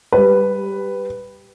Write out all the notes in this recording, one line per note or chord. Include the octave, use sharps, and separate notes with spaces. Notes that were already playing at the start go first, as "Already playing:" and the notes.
G3 B4